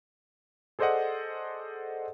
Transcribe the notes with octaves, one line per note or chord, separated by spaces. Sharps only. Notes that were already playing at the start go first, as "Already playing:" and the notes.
G#4 A4 C5 D5 D#5 F#5